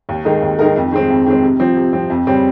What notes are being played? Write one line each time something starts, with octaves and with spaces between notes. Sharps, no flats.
D#2
D#3 G#3 D#4 A#4
D#2
D#3 G#3 D#4 A#4
F2
D#3 G#3 C4
F2
D#3 G#3 C4
C3
F3 C4
C3
F3 C4
F2
C#3 G3 C4